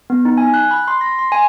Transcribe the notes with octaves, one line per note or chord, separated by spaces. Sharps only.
B3
D#4
G#5
F#6
B5
C6
A#6
C6
G#5